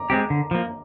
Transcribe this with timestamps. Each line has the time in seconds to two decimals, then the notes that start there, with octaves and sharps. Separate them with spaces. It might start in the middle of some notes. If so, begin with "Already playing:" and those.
Already playing: A#5 D6
0.10 G#3 C4 G4
0.30 D3
0.51 F3 A#3